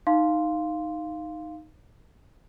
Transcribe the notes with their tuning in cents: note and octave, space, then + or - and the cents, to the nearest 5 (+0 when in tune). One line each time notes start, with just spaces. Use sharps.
D#4 +0 F5 +0 C6 +0